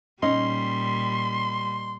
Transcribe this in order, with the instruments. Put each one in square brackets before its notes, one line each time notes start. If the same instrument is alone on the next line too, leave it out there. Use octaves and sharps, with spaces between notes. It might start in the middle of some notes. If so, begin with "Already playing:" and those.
[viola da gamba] A#2 G3 [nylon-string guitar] C#4 [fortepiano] D#4 [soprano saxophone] C6